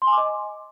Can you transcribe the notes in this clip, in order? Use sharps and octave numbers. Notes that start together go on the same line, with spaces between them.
C6
G#5
D6
D#5